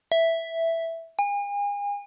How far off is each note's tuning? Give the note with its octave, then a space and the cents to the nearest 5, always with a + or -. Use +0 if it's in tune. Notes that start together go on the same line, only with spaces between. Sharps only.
E5 +0
G#5 -40